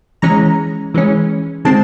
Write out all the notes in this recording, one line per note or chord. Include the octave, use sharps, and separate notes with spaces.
E3 G#3 C#4 A#5
E3 G#3 C#4
D#3 G#3 C4 A5